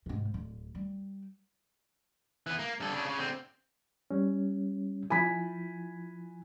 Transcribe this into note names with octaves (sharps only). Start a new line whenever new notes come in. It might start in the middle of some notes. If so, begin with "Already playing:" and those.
G#2 C3
D1
G3
E3 B3
A#3
G2 A4
C#3 D4
C#3
D3 C4
G3 C#4
F3 E4 G#5 B5 B6